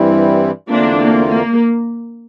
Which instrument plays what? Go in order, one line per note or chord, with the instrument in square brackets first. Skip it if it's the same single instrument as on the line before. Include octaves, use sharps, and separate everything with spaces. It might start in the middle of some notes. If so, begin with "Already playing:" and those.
Already playing: [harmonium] G2 E3 G3 C4 E4
[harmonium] E2 D3 A3 C4 F4 [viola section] A#3 D4
[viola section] A#3
A#3